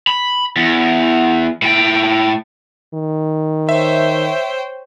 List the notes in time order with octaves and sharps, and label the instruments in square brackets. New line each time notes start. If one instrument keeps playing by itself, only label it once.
[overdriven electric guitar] B5
E2
A2 G5
[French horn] D#3
[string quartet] C5 C#5 G5 [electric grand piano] E5